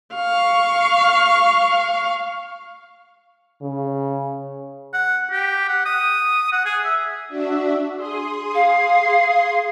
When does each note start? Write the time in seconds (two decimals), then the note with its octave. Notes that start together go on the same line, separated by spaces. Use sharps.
0.14 F5 C#6
3.62 C#3
4.93 F#5
5.31 G4
5.68 F#5
5.85 D#6
6.52 F#5
6.66 G#4
6.84 E5
7.28 D4 F#4 E5
7.96 G#4 C6 D#6
8.55 F5